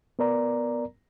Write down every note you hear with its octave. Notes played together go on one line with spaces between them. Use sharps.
B3 A#4 D5 A#5